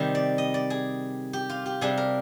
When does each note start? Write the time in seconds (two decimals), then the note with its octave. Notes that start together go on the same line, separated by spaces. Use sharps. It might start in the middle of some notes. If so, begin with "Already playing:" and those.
Already playing: C3 D#3 G3
0.15 D5
0.38 D#5
0.54 D5
0.70 G#4
1.33 G4
1.50 F4
1.66 G4
1.81 C3 G3 D4 G#4
1.97 A#4